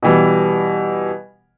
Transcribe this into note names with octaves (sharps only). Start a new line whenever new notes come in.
B2 E3 G3